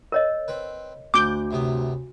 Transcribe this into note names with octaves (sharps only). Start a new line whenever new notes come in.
A#4 C#5 D#5
C4 B4
D2 F#5 D6 G6
F#2 C3 B3